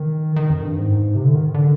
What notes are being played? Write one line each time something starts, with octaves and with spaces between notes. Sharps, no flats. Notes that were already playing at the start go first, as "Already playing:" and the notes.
Already playing: D#3
D#3
F2
G2
G#2
C3
D3
D#3
D3